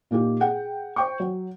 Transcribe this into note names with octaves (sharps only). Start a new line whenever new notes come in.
A#2 A#3 D#4 G4
G#4 F#5 G5
C5 G5 C#6
F#3